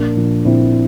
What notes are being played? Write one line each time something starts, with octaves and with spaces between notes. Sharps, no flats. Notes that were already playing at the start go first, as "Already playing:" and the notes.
Already playing: A#1 A#3 D4
A#2 F3
A#1 C4 E4